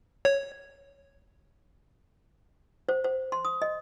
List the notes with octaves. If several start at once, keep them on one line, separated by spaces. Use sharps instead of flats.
C#5
C5
C5
C6
D#6
D#5